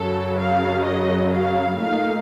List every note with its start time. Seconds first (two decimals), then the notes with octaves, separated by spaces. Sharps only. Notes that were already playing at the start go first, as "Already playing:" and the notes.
Already playing: F#2 C#3 F#3 A4
0.39 F5
0.85 D#5
1.33 F5
1.80 A#2 A3 D#4 F5